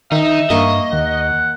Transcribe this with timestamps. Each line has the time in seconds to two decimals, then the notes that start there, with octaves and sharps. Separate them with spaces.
0.12 D#3 D#4 E5
0.50 G2 A#3 D#5 C#6
0.93 D#2 F#5